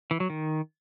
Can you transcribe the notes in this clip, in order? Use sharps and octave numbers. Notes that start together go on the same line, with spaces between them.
E3
F#3
D#3